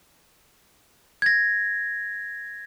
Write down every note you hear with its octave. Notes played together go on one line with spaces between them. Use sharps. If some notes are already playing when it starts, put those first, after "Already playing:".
G#6 A#6